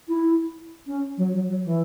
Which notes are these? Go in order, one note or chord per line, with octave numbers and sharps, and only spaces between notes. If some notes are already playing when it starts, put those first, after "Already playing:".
E4
C#4
F#3
F#3
F#3
E3